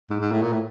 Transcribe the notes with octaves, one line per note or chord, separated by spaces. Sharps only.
G#2
G#2
A2
A#2
A2